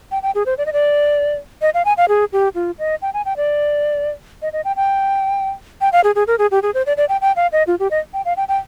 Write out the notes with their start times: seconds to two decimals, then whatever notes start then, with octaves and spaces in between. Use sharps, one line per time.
0.11 G5
0.23 G5
0.35 G#4
0.46 C5
0.58 D5
0.66 D#5
0.73 D5
1.62 D#5
1.74 F5
1.85 G#5
1.97 F5
2.09 G#4
2.33 G4
2.55 F4
2.79 D#5
3.02 G5
3.14 G#5
3.25 G5
3.37 D5
4.42 D#5
4.53 D#5
4.65 G5
4.76 G5
5.81 G5
5.92 F5
6.04 G#4
6.15 G#4
6.27 A#4
6.39 G#4
6.51 G4
6.63 G#4
6.74 C5
6.86 D5
6.97 D5
7.09 G5
7.21 G5
7.36 F5
7.52 D#5
7.67 F4
7.79 G4
7.91 D#5
8.14 G5
8.25 F5
8.37 G5
8.48 G5